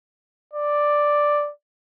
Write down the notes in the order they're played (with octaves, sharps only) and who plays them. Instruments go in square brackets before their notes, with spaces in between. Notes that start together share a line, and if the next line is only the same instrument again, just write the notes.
[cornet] D5